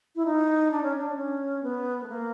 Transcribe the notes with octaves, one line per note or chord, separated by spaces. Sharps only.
E4
D#4
D4
C#4
D4
C#4
B3
A3
A#3